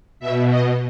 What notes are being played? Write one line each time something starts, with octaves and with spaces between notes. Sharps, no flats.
B2 E5
D#5